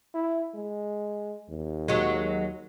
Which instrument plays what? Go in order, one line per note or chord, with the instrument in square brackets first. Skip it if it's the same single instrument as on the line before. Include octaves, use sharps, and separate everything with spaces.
[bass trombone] E4
G#3
D#2
[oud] F#3 G#3